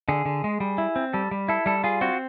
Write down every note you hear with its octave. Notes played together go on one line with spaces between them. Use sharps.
D3 G#4
D3
G#3
G3
E4
C4
G3 A4
G3
E4 A4
G3 A4
F4 G#4
C4 F#4